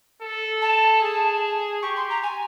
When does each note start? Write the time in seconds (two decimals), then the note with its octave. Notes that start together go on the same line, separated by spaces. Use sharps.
0.22 A4
0.62 A5
1.02 G#4
1.83 G4 C#6
1.96 C6
2.10 A#5
2.23 G#5